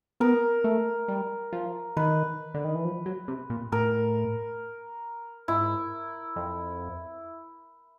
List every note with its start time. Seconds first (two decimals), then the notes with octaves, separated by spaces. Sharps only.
0.20 B3 A#4
0.64 A3
1.08 G3
1.52 F3
1.97 D#3 B4
2.54 D3
2.64 D#3
2.75 E3
2.85 F3
3.06 F#3
3.28 C3
3.50 A#2
3.72 A2 A#4
5.48 G#2 E4
6.36 F2